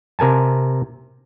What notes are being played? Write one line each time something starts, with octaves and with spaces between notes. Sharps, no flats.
C3 A#4 G#5 A5